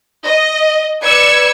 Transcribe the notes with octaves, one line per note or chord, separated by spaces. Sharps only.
D#5
B4 D5 E6 G#6 C#7